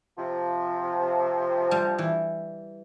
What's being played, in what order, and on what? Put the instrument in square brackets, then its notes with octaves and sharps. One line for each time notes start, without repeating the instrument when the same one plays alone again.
[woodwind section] C3 F3
[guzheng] G3
E3